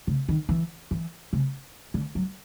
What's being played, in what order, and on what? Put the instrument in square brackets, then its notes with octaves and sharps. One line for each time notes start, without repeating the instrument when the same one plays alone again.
[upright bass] C#3
D#3
E3
E3
C#3
D3
F#3